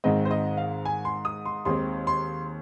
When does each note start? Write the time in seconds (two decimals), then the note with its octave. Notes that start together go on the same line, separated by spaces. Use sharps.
0.04 G#1 G#2 D#3 G#3 C4 D#5
0.25 C5
0.31 D#5
0.57 F5
0.85 G#5
1.05 C6
1.25 D#6
1.45 C6
1.65 D#2 D#3 G#3 C4 C6
2.07 C6